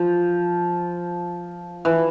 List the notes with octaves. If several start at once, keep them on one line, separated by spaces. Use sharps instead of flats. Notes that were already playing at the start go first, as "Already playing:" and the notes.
Already playing: F3
E3